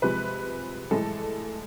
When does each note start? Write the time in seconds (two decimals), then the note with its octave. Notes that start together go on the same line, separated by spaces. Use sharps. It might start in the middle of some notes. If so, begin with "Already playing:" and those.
0.02 C3 F3 G#3 B4
0.91 A2 E3 G#3 A4